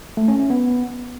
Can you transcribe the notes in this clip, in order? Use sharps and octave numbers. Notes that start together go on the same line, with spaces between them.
A3
C#4
C#4
B3